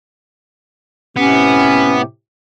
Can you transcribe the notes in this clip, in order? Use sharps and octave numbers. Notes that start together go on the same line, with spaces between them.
A2 C3 B3 C#4 G4